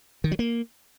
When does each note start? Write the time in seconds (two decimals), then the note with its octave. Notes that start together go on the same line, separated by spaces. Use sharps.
0.24 D#3
0.32 F#3
0.39 A#3